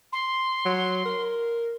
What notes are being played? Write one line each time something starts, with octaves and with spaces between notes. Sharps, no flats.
C6
F#3
A#4